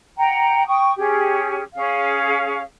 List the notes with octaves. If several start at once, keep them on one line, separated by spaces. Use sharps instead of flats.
F#5 G5 A#5
G5 C#6 D#6
C#4 G4 G#4
C#4 G#4 F5